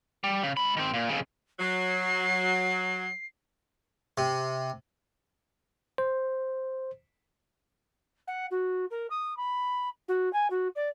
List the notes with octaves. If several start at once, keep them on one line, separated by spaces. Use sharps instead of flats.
G3
C#3
G#3 B5
D#3 C4
A#2
F2 C#3
F#3 C7
C3
C5
F#5
F#4
A#4
D#6
B5
F#4
G#5
F#4
D5